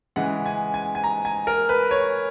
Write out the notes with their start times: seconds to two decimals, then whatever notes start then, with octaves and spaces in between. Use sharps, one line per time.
0.16 C#3 E3 G#3 F#5
0.46 G#5
0.74 G#5
0.95 G#5
1.04 A#5
1.25 G#5
1.47 A#4
1.69 B4
1.91 C#5